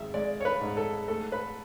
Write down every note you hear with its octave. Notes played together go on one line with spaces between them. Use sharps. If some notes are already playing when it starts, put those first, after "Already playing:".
Already playing: G#1 E5
G#3 D5
C#5
B4
G#2
A4
A3 A4
B4